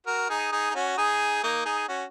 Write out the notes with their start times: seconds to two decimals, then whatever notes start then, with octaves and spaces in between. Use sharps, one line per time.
0.06 F#4 A#4
0.29 D#4 G#4
0.52 D#4 G#4
0.70 D#4
0.75 C#4 F#4
0.97 D#4 G#4
1.43 A#3 D#4
1.65 D#4 G#4
1.88 C#4 F#4